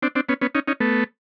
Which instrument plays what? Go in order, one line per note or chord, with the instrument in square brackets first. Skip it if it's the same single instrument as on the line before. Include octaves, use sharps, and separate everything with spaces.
[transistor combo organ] C4 D4
C4 D4
B3 C#4
B3 C#4
C#4 D#4
C#4 D#4
A3 B3